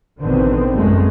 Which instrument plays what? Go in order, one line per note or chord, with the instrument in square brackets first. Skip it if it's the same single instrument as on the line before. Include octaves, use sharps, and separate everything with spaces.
[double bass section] A1 B2 D3 D#3 B3 C4
C2 F#2 A2 G#3 A3